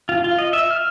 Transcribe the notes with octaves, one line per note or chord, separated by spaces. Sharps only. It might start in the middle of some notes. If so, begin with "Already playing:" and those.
F4
F4
D#5
E5
F6